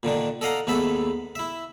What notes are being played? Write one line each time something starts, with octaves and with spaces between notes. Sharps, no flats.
A#2 D3 D#3 D4
A4 D5 D#5 F5 F#5 A#5
D#2 G#2 B3 A4 E5 B5
E4 E5